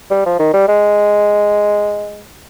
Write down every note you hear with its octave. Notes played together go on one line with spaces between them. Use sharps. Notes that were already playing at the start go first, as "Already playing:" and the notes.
G3
F3
D#3
G3
G#3